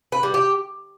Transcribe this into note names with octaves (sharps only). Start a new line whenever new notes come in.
B4
G3
G4